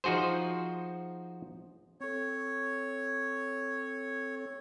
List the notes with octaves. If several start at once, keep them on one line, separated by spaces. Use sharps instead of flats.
F3 D#4 F#4 G#4 C5
C4 A4 C#5